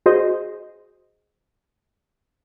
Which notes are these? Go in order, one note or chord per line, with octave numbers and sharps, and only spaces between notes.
F#4 G#4 C5 D#5